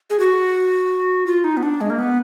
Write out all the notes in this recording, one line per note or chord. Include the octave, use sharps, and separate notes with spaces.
G#4
F#4
F4
D#4
B3
D4
G#3
A#3
B3